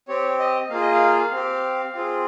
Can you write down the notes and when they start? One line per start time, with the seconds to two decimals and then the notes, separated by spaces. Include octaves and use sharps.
0.08 C4 G4 C#5
0.39 D#5
0.70 A#3 F4 G#4 F5
0.81 D#5
0.92 F5
1.32 C4 G4
1.93 C4 F4 G#4